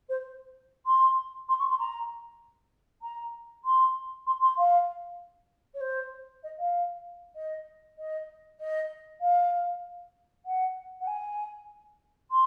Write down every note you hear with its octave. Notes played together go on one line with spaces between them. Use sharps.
C5
C6
C6
C#6
C6
A#5
A#5
C6
C6
C6
F5
C#5
C5
D#5
F5
D#5
D#5
D#5
F5
F#5
F#5
G#5
C6